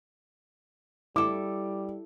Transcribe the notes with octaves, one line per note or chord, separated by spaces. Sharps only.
G3 E4 A4 D6